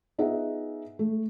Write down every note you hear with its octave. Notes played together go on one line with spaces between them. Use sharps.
B3 D#4 F4 G#4 E5 F#5
A3